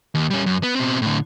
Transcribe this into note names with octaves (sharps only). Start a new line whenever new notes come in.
D#2
G3 C#4
F#2
B3
B2 C4
A2 D3